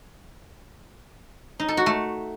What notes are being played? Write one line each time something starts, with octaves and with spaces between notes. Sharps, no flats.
D#4
A4
F#4
A3